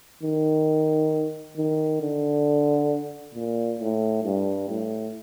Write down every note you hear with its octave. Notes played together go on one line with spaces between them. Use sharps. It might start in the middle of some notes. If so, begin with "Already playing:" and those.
D#3
D#3
D3
A#2
A2
G2
A2